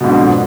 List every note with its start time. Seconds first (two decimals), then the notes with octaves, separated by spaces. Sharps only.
0.01 B2
0.04 G#2
0.08 D3
0.11 F2